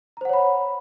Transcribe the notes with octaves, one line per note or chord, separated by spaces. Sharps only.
C5 C#5 F#5 A#5 B5